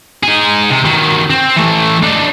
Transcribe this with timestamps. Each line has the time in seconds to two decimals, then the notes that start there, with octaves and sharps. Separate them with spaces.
0.23 D#4 G#4
0.71 C3
0.86 D#3 F#3
1.30 C4
1.56 E3 A3
2.03 D4 D#4